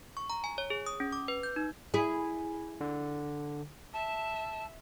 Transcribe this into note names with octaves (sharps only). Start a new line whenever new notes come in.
C#6
A#5
G#5
C#5
G#4
D#6
C#4
D6
B4
G6
D#4
E4 G#4
D3
E5 A5